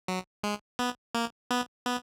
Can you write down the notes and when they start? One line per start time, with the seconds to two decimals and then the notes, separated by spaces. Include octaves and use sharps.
0.08 F#3
0.44 G#3
0.79 B3
1.15 A#3
1.51 B3
1.86 B3